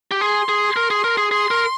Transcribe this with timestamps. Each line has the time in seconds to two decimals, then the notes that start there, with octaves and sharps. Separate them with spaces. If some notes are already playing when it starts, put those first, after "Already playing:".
0.11 G4
0.21 G#4 C6
0.49 G#4
0.76 A#4
0.90 G#4
1.04 A#4
1.18 G#4
1.31 G#4 C6
1.51 A#4